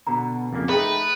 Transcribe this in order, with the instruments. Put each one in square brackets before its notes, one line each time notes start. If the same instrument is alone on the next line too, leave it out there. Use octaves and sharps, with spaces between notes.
[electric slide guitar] B2 D3 [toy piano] A#5
[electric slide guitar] F2 C#3 A#3
[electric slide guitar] A3 D#4 [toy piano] G#4 G5 [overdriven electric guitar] B4